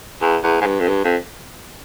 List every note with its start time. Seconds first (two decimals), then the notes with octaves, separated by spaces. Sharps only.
0.21 E2
0.43 E2
0.61 G#2
0.66 G2
0.80 F2
0.88 G2
1.04 F2